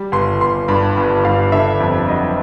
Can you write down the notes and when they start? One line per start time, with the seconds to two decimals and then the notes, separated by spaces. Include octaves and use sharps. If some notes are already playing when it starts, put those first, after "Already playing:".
Already playing: G3
0.12 G1 C6
0.41 G1 C6
0.68 G2 B5
0.97 G1
1.25 G2 F5
1.52 D3 E5
1.80 F2
2.08 F#3 D#5